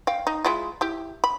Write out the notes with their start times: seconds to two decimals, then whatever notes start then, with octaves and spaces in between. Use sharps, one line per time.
0.07 F5 G5
0.27 D#4
0.45 G#3 E4 F4
0.81 E4 G4
1.24 B5